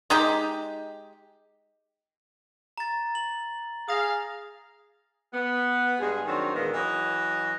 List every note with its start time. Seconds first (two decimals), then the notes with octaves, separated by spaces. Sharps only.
0.10 G#3 D#4 G4
2.78 A#5 A6
3.15 F#7
3.88 G#4 F5 D#6 A#6
5.34 B3
5.99 G2 G#3 G#4
6.26 D#3 F#3 C4 D4 D#4
6.54 E2 A#2 D#3 G#3 B3
6.74 E3 F#3 D#5